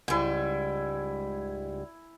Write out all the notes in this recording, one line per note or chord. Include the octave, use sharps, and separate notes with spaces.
C#2 G#2 G3 E4 G#5